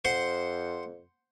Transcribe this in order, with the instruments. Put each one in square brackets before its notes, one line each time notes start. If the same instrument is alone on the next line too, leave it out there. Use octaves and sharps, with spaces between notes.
[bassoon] F2 [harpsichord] C5 F#5 C6